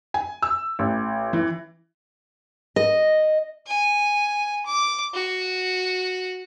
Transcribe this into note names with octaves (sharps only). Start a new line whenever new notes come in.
G#5
E6
A1
E3
D#5
G#5
D6
F#4